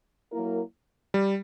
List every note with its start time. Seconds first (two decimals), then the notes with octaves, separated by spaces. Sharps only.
0.32 F#3 A#3 E4 A#4
1.14 G3